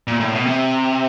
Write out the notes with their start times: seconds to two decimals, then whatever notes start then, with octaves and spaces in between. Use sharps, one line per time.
0.07 A#2
0.20 A2
0.33 B2
0.46 C3